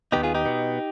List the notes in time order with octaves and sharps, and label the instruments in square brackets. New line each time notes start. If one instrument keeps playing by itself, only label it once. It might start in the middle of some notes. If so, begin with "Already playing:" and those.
[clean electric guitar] D#2 D#3 B3 D#4 G4
F4 G#4
D#4 G4
B2 B3